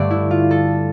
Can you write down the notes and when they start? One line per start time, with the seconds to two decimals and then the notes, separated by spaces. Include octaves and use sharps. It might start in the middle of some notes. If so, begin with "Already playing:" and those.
Already playing: G2 D3 A3 D4 D5 E5
0.11 E4
0.31 F4
0.51 A4